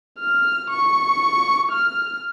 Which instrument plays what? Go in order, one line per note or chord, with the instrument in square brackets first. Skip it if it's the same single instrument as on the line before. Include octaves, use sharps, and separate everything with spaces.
[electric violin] F6
C#6
F6